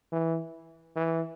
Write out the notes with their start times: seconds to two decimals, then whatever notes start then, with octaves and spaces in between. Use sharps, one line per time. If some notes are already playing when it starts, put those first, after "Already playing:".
0.12 E3
0.96 E3